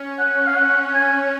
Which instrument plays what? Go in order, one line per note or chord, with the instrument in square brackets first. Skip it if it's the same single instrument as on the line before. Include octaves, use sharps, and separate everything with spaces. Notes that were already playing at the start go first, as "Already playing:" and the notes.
Already playing: [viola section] C#4
[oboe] F#5
F5
F#5
G#5